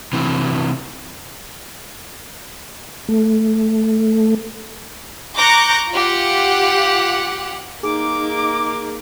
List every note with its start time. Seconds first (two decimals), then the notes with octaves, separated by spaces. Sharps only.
0.13 C3 E3 F#3
3.09 A3
5.37 A#5 C#6 D6 F#6 G6 A#6
5.92 F4 G4 F#5
7.83 A#3 D#4 G#4 D6